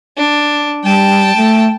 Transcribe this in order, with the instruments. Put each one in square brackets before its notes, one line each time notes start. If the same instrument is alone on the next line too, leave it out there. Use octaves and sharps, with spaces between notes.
[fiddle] D4
[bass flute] G3 [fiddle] G5 A5
[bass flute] A3